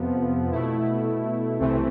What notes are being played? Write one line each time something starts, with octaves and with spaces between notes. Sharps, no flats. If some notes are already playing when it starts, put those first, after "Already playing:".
Already playing: F2 C3 F3 B3
B2 A3 E4
C2 C3 E3 A3 C4